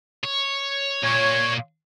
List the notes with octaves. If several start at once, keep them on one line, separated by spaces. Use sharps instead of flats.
C#5
A#2 C#5